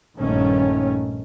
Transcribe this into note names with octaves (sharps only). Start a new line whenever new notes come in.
A#1 G2 D#3 A3 C#4